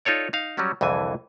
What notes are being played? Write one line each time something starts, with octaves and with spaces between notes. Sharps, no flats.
D#4 F4 A4 C#5 D5
D#4 F5
F#3 G3 C#4 F#4
C2 F2 D3 E3 G#5